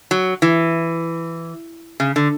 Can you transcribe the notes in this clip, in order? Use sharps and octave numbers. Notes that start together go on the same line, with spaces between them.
F#3
E3
C#3
D3